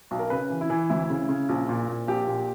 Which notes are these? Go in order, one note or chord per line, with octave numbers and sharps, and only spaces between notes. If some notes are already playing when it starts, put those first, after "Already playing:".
B1
A#4
C#3 B4
E3
E4
E3
D2 E4
C#3
C#3
A#1
A#2
A#2
A#1 G4
A#2